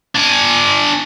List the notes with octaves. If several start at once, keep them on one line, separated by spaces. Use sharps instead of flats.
D4 G#5